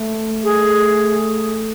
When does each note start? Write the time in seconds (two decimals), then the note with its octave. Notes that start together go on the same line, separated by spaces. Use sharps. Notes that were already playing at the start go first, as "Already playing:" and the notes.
Already playing: A3
0.44 G#4